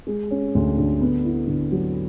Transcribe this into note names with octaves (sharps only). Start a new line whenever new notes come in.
G#3
C#4
D2
D3
B3
E4
D3
F#3